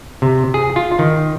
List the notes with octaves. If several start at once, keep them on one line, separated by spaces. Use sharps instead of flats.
C3
G#4
F4
D#3